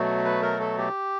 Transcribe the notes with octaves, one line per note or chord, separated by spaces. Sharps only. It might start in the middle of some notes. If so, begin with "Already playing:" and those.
Already playing: B2 F#3 A3
B4
A#4
A4
G4